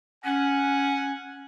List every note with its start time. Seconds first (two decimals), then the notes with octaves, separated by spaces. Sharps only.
0.25 C#4 F#5 G#5